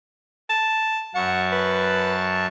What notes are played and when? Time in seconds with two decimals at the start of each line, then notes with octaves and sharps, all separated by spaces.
0.50 A5
1.15 F#2 F#5 A5 C#6
1.52 B4